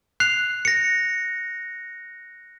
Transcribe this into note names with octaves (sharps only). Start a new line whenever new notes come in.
F#6 C7 F7
A#6 C#7